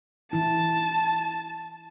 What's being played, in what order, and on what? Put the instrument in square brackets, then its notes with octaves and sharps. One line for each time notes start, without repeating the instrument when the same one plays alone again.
[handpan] E3 E4 [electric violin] A5